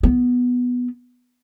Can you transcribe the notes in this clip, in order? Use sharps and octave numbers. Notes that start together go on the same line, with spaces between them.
B3